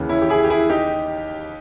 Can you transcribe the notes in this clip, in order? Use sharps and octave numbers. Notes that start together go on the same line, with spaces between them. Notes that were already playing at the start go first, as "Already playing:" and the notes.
Already playing: D#2 C#3 E3
C#4 E4
G4
E4 G#4
G4
E4 G#4
D#4 G4